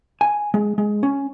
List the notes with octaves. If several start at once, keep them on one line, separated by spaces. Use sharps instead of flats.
G#5
G#3
G#3
C#4